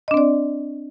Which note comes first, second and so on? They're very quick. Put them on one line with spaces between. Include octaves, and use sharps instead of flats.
D#5 D4 C4 D5